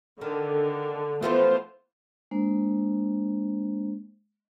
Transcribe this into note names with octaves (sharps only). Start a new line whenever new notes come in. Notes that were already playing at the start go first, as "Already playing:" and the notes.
D3 D#3
E3 F3 A3 B3 F4 C5
G#3 A#3 D4 C5